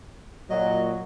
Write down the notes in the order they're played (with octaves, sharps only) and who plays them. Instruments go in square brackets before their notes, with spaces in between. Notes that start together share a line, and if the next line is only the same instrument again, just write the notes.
[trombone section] A#2 F#3 [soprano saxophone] D#5